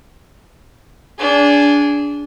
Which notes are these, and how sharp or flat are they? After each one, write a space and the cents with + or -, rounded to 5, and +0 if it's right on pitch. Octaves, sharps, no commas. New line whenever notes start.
D4 -25 G#4 -5